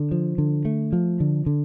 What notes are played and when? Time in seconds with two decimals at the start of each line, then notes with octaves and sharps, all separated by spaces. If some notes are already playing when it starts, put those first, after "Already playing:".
Already playing: D3
0.11 F3
0.38 D3
0.65 A3
0.93 F3
1.20 D3
1.46 D3